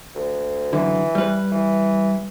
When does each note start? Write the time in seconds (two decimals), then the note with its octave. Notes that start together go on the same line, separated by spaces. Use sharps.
0.15 D2
0.73 F#2 D3 E3
1.15 G3 B4
1.52 E3